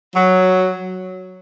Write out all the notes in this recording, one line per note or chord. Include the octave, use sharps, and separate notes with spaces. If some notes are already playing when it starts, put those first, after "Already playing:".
F#3